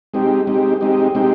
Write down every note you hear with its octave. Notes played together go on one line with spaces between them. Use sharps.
G#3 C4 D#4 G4
G#3 C4 D#4 G4
G#3 C4 D#4 G4
G#3 C4 D#4 G4